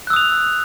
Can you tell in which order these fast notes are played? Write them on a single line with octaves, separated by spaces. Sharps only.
F#6 E6 D#6 F7